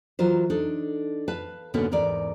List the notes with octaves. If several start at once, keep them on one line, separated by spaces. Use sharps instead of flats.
E3 F#3 F4 A#4 C5
D4 D#4 A4
B4 F5 A5
G#2 B2 D3 A#3 B3 C#4
E2 G#2 A#4 D5